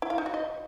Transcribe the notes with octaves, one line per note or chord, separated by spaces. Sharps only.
E4
F5
D#4
F#4
D#5